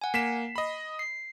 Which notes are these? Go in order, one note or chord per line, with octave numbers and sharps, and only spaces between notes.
F#5 G#5
A#3 B6 C7 E7
D#5 B5
C7